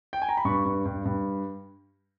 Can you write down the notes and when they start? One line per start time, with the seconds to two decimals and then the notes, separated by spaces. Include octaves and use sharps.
0.13 G5
0.22 G#5
0.29 A#5
0.37 B5
0.45 G2 C#6
0.65 G2
0.85 G2
1.05 G2